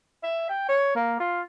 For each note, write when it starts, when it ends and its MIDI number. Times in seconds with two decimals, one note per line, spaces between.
0.23 0.45 76
0.49 0.67 79
0.69 0.91 73
0.95 1.19 58
1.20 1.42 65